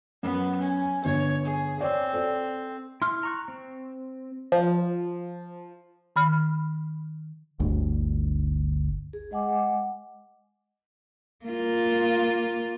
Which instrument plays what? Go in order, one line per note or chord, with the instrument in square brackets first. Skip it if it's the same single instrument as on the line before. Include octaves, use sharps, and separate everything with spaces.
[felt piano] F#2 [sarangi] B3
[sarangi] C#4
[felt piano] G1 [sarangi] C#5
[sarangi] G#4
[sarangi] C4 [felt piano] C#5 D5
[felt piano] A4 C5 D5
[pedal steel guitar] E4 [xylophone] C6 F6
[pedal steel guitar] A#5 C#6 F#6
C4
[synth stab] F3
[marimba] D#3 B5 F6
[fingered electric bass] G1 D2
[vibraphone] G#4
G#3 D#5 F#5 G#5 D6
[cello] A#3 F4